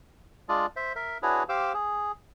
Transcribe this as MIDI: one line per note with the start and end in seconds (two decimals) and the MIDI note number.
0.49 0.66 56
0.49 0.66 62
0.49 0.66 65
0.49 0.66 74
0.49 0.66 75
0.76 0.93 72
0.76 0.93 76
0.96 1.18 70
0.96 1.18 76
1.23 1.43 62
1.23 1.43 64
1.23 1.43 66
1.23 1.43 68
1.23 1.43 71
1.23 1.43 73
1.49 1.73 67
1.49 1.73 72
1.49 1.73 77
1.49 1.73 86
1.49 1.73 88
1.74 2.12 68